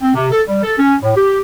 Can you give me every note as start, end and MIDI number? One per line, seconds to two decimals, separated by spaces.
0.01 0.14 60
0.14 0.29 48
0.31 0.41 69
0.48 0.60 55
0.63 0.74 69
0.78 0.96 61
1.02 1.13 45
1.16 1.40 67